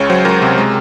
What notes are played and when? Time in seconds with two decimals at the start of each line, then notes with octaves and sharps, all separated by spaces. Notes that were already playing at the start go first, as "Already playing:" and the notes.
Already playing: C#2 C#3 C#5
0.10 F#3 C5
0.25 C#2 A#4
0.42 C3
0.58 G#3